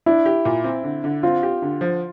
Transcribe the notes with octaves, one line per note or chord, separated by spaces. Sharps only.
D4 E4
G4
A#2
C4
D3
D3
C4 F4
G4
D3
F3